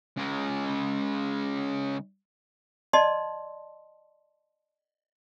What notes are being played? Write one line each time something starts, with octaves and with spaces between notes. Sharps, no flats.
C#3 G#3
D5 D#5 A5 C6